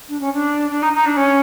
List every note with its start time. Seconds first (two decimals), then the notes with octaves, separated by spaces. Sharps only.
0.08 D4
0.20 C#4
0.32 D4
0.69 D4
0.82 D#4
0.93 D#4
1.05 D4
1.16 C#4